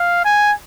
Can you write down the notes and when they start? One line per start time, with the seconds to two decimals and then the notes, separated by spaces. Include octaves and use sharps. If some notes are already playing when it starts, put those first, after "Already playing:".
Already playing: F5
0.25 G#5